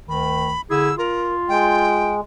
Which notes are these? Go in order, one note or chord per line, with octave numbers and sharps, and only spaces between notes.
D2 D#3 B5
D3 E4 G#4 E6
F4 A#4
G#3 G5